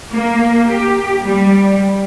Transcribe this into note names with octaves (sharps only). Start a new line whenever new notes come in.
A#3
G4
G3